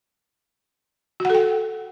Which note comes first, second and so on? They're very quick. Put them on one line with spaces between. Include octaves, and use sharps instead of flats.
F#4 F#5 A4 G5